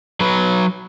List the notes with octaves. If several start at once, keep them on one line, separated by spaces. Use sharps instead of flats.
F#3 B4